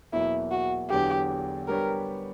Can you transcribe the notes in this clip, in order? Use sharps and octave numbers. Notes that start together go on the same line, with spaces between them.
E2 B2 F#3 A#3 E4
F#4
E2 D3 F#3 B3 D4 G4
G3 B3 D4 G4 A#4 C#5